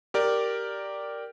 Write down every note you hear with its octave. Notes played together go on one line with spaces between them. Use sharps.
G4 A#4 D5